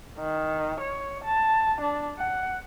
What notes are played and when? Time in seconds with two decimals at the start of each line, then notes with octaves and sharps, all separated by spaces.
0.18 D#3
0.80 C#5
1.24 A5
1.81 D4
2.18 F#5